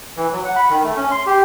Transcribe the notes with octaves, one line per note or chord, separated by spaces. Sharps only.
E3
F#3
F#5
B5
D#3
A3
C#4
C6
G4